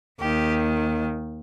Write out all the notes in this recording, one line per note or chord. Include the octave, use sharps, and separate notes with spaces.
D#2 D#3 G4